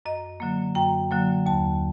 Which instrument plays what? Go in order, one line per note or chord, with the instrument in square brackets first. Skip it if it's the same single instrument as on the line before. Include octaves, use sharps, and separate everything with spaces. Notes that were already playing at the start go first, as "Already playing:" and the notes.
[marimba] F#2 D#5
D3 F#3 A#3
F#2 G5
D3 F#3 A#3
D#2 A5